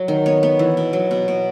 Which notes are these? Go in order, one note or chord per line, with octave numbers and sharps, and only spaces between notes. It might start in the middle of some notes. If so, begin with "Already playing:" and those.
Already playing: F#3
D#3
B3 C#5
B3
E3
B2
F#3
B2
B2